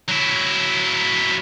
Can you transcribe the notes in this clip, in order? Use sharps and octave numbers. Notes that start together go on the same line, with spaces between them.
F#3 E4